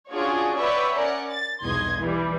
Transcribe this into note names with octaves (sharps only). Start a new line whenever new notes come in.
C#4 D4 F4 F#4 G#4 C#5
B4 C#5 D5 E5 F#5 G5
C#4 A#4 D5 F#5
A6
B1 E2 G2 D#5 C6 G#6
E3 G3